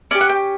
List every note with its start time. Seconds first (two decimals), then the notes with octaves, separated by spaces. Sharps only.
0.11 C#4 D5
0.15 G4
0.21 F#5
0.29 G5